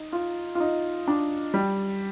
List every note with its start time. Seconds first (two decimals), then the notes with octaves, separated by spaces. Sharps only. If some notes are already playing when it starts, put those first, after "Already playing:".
Already playing: D#4
0.13 F4
0.55 F4
0.60 D#4
1.08 D4
1.54 G3